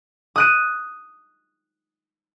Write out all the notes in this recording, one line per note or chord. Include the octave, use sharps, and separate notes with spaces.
D#6 F#6 D#7